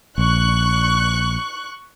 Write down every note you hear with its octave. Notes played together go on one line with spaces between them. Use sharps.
A#1 C#6 F#6